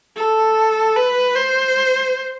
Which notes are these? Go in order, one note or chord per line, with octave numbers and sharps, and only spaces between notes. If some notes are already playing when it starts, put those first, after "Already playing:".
A4
B4
C5